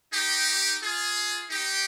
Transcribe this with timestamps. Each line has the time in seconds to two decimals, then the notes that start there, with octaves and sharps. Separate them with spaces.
0.13 D#4 G4
0.82 F4 G#4
1.51 D#4 G4